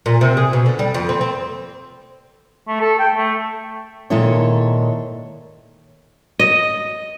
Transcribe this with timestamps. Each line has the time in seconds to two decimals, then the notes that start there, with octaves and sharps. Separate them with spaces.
0.06 A#2
0.21 C3
0.37 G#4
0.53 B2
0.66 D3
0.79 G3
0.94 F2
1.09 C4
1.21 C4
2.68 A3
2.81 A4
2.99 G5
3.15 A3
4.10 A#2 D#3 G#3 E4 A4 C#5
6.39 D#5